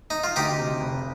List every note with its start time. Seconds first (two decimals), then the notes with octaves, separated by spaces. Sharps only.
0.10 D#4
0.24 F4
0.36 D2 D#4 G4
0.58 C3
0.81 F1